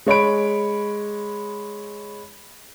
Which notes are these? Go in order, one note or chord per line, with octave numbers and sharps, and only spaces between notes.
G#3 C#5 B5 D7